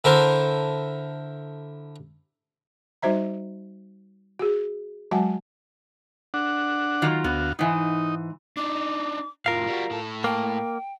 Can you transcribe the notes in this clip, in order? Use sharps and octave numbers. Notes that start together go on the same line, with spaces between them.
D3 E4 A4 A#4 C5
G3 D#4 F#4 C5 E5 A#5
F#4 G#4
F#3 G#3 F#4 F#5 G#5 A5
D4 F#5
D#3 F#3 F4
D2 B3 F#4 F5
G#2 E3 D#4
D4 D#4 D6
F2 A2 F4 A#4 F5
G3 F#4
A2 A4
A#3 G5